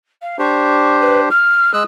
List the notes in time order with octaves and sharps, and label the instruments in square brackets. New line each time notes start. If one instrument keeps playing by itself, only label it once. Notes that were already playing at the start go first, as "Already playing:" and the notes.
[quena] F5
[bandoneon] D4 G4 C5 [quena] C#6
[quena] B4
F6
[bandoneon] G#3 E6 F#6 [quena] D#6